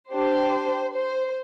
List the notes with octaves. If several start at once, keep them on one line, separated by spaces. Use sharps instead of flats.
D4 G4 C5
C5